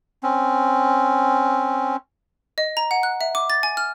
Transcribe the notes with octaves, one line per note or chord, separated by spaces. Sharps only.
C4 C#4
D#5
A#5
F#5
F#6
E5
D6
A6
G#5
F6